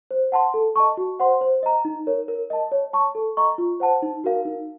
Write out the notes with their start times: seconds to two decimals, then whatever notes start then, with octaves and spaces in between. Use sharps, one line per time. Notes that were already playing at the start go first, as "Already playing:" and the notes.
0.11 C5
0.32 F#5 A5 C6
0.54 A4
0.76 D#5 A5 C#6
0.97 F#4
1.20 C5 F#5 C6
1.41 C5
1.63 D#5 A#5
1.85 D#4
2.07 A#4 C#5
2.28 A#4
2.50 D#5 A5
2.72 C#5
2.93 A5 C#6
3.15 A4
3.37 D#5 A#5 C#6
3.58 F4
3.80 C5 F#5 A5
4.02 D#4
4.24 F#4 A#4 F5
4.45 D#4